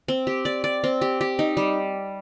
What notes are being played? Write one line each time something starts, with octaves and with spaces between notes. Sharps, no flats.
C4
G4
D5
D5
C4
G4
G4
D#4
G3